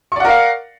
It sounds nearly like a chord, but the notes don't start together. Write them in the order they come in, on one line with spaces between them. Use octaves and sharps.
C#6 D5 F#5 A#4 F5